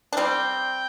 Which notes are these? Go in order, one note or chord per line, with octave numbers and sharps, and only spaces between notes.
D4
G3 C4 G5